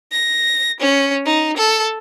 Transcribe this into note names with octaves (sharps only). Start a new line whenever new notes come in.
A#6
C#4
D#4
A4